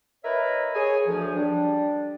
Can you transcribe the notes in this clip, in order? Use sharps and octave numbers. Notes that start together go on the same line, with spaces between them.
E4 A#4 B4 C#5 D#5 E5
G#4 C#5 G#5
D2 F3
G3 D4